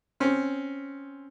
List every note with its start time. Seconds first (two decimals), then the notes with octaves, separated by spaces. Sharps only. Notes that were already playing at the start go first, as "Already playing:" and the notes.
0.20 C4 C#4